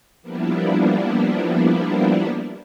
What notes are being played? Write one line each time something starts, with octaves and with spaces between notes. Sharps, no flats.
F3 G3 A#3 B3 D4 E4